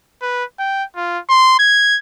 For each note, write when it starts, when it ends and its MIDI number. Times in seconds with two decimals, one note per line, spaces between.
0.22 0.44 71
0.59 0.84 79
0.96 1.19 65
1.29 1.57 84
1.59 1.98 92